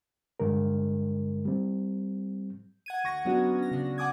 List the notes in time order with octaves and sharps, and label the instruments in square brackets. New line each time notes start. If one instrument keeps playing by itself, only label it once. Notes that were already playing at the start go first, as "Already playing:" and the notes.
[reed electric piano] G2 D3 G#3 A#4
G3 C4
[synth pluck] F#5 G#6 D#7
D2 C#6 A#6
F#3 B3 C#4 D4 F#4
C#4 A#6
C#3 D4
F#5 G#5 D6 D#6 G#6